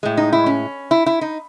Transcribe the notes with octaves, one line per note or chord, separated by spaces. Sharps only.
A2 G#3
D#4
E4
C#4
E4
E4
D#4